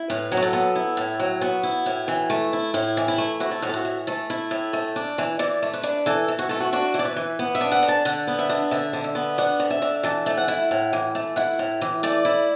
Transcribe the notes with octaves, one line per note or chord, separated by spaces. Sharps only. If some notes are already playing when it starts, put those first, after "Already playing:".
Already playing: E4
A2 B4
F#3
F#4
A4
B3
E4
A2
F#3
B3 F#4
E4
A2
E3
A3
E4
A2 E4
E3
E4
A3
E4 F#4
A4
A2 F#4
A4
F#4
E3
A3 A4
E4
A2
A3
D4
E3
E3 D5
A3
B4
D4
E3 A4
E3
F#4
A3 A4
F#4
D4 F#4
E3
D5
B4
E3
B3
E5
D4
F#5
D3
A5
D3 F#5
B3
E5
D4
D3 E5
D3
E5
B3
D4 F#5
D3
E5
D3
E3 A5
A3
F#5
E4
A2
E3
A3
E4 F#5
A2
E3
A3 D5
E4